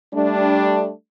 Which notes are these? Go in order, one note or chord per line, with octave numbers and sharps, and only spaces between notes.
G3 A3 D4